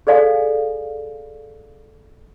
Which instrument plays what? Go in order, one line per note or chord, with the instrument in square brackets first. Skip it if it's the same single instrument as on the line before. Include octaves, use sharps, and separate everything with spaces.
[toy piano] G#4 A4 D5 F5 G#5